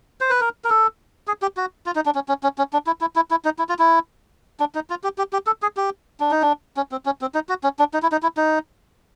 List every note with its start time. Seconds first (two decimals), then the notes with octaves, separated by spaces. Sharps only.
0.21 C5
0.30 B4
0.41 A#4
0.64 A#4
0.70 A4
1.27 G#4
1.42 G4
1.57 F#4
1.86 F4
1.96 D#4
2.06 D4
2.15 C#4
2.28 C#4
2.43 C#4
2.58 C#4
2.73 D4
2.87 E4
3.01 E4
3.16 E4
3.31 E4
3.45 D#4
3.59 E4
3.69 F4
3.79 E4
4.60 D4
4.75 D#4
4.90 F4
5.04 G4
5.18 G4
5.33 G4
5.47 A4
5.62 G#4
5.77 G4
6.20 D4
6.31 D#4
6.42 D4
6.77 C#4
6.92 C4
7.06 C#4
7.21 C4
7.35 D#4
7.49 F#4
7.64 C#4
7.79 D4
7.94 D#4
8.02 E4
8.12 D#4
8.23 E4
8.37 D#4